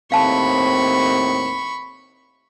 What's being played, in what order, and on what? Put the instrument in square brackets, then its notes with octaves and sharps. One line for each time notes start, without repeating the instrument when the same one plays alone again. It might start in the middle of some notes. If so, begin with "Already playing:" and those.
[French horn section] D#2 A2 C4 [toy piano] F5 A5 [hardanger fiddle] B5 C#6